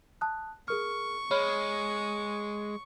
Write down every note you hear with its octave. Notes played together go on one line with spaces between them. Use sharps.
A5 D#6 F#6
G#4 A#4 C#6 F6
G#3 C#5 B5 F6